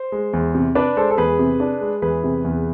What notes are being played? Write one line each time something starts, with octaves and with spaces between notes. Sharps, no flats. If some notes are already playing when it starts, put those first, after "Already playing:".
Already playing: C5
G#3
E2
C3
D4 B4 D5
G#3 A4 C5
A4
E2 G#4 B4
C3
D4
G#3
E2 G#4 B4
C3
E2